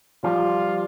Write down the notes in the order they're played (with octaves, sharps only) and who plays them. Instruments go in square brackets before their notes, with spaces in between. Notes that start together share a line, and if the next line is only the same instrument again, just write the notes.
[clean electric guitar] F3 G3 [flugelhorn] F4